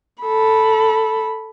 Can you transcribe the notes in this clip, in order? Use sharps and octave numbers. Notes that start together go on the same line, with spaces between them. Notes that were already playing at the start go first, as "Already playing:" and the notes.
A4 B5